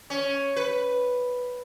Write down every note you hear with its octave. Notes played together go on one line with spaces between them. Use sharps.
C#4
B4